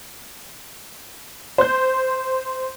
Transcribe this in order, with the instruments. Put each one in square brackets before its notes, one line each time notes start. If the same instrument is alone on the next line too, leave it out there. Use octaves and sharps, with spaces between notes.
[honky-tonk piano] C5 G6